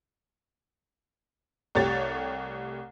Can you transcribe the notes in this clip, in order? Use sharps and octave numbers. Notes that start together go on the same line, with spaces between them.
C2 A3 G4 C#5 A6